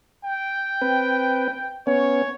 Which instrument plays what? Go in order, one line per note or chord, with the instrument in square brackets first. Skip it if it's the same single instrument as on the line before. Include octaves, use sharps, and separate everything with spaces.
[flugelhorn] G5
[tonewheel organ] C4 B4
[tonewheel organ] B3 C#4 [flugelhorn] C#5